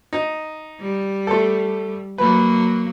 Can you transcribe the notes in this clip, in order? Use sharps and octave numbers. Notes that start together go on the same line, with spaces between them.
D#4
G3
A3 A4
F#3 A#3 B4